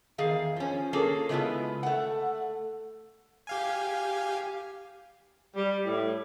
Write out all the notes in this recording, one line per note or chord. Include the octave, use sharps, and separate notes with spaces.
E2 D#3 G#4 F5
F3 C#4
A#3 C#4 F4 G#4 A4
C#3 G#3 A3 B3 E4 F4
A3 F#5
G4 F5 G#5
G3
A2